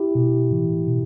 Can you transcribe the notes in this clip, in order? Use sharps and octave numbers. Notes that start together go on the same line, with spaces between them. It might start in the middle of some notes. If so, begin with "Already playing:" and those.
Already playing: E4 G4
B2
A2 E3
B2